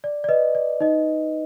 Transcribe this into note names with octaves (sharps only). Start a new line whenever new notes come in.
D5
D5
B4 D#5
D5
D#4 D#5